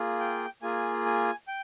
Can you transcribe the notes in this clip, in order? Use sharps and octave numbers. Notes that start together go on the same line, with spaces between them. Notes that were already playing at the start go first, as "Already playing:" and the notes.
Already playing: A#3 F4 G#4
G5
A#3 F4 G#4 G#5
G#5
G5